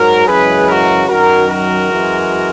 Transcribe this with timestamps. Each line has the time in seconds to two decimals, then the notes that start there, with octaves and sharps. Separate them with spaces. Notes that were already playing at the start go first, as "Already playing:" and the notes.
Already playing: G#2 F#3 F#4 A#4
0.27 F#2 C#3 E3 G#3 G#4 B4
0.68 F#4 A#4
1.08 F#2 D#3 F#3 F#4 A#4
1.49 F#4 A#4
1.90 F#2 E3 G#3